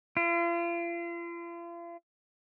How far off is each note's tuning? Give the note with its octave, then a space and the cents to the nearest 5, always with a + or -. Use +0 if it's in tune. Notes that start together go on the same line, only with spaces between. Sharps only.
F4 -40